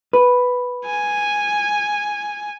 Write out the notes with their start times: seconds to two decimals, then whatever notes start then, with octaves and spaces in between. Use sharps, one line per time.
0.13 B4
0.85 G#5